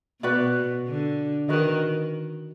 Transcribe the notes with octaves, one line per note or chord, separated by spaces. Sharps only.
B2 F#4 B4 D5
D3
D#3 F#4 B4 D#5